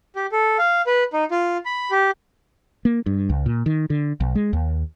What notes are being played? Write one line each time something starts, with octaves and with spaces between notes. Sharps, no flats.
G4
A4
F5
B4
D#4
F4
B5
G4
A#3
G2
C#2
A#2
D#3
D3
B1
G#3
D#2